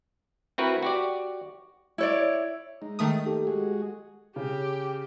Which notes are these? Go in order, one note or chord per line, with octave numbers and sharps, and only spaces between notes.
C4 E4 F#4 A#4 B4
F#4 G4 D5
E4 C#5 D5
G#3 D#4
D#3 A3 D#6
A#3 G4 A4
G#3 F#4 G#4
C#3 G4